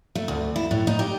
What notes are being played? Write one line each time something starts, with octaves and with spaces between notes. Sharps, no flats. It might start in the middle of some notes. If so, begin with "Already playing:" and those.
A3
D2
E4
A2
D#4
G4